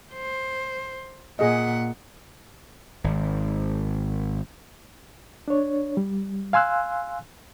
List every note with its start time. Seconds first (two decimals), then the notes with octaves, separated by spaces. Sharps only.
0.13 C5
1.39 A#2 G#4 D#5 F#5
3.04 G#1
5.48 D4 C#5
5.97 G3
6.53 F5 G#5 C6 E6 F#6